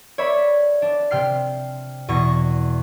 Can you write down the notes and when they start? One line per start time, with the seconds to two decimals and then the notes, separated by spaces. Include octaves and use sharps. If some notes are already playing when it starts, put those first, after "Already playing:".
0.18 C#5 D5 E5 B5
0.82 D4
1.11 C3 G5 F6 C7
2.08 E2 B2 C#6 A#6